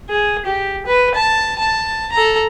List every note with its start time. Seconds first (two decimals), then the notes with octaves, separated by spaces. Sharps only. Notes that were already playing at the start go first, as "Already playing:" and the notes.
0.10 G#4
0.46 G4
0.86 B4
1.15 A5
1.59 A5
2.12 A4 A#5